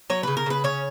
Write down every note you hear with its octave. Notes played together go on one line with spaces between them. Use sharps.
F#3 C#5
C#3 B4
A#4
C#3 B4
C#4 C#5